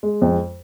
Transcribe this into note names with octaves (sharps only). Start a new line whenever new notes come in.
G#3
F2